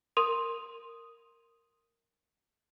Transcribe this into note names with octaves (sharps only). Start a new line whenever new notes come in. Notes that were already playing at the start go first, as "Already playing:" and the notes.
A#4 C6 D#6 D#7 F7